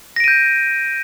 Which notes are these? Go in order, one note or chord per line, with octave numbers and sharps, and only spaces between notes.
G6 A#6 D7 D#7